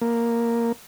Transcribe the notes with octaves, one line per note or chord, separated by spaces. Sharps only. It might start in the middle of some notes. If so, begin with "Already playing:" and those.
A#3